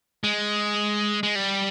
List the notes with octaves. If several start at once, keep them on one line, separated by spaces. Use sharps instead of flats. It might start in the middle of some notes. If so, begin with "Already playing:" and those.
G#3
G#3
G3